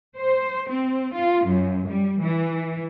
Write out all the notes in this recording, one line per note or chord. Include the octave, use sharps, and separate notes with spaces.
C5
C4
F4
F#2
G3
E3